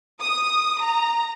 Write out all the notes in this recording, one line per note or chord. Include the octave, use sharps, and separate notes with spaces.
D#6
A#5